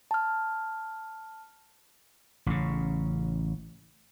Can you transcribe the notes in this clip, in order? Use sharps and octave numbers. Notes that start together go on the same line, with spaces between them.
A5 F6
A1 C#3